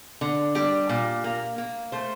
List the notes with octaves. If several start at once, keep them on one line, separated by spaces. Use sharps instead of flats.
D3
G3 G4
A#2
A#3
A#3
A3 C5